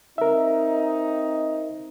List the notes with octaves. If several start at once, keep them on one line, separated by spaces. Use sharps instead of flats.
C4 D#4 A#4 E5